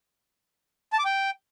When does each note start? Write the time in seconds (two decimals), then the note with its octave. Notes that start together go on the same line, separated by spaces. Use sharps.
0.93 A5
0.99 D6
1.05 G5